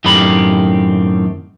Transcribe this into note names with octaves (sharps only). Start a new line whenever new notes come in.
F#2 A2 D#3 C4 G4 B5